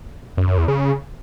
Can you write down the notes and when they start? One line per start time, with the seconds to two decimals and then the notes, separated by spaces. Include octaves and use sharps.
0.37 F#2
0.48 F#2
0.58 E2
0.68 C#3